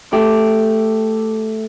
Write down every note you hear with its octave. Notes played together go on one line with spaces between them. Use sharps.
A3 G4